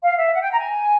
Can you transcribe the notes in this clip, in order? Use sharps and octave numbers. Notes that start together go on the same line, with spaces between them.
F5
E5
F#5
G5
A#5
G#5